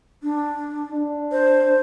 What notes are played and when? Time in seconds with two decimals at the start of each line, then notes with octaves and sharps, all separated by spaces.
0.23 D4
0.92 D4
1.32 C5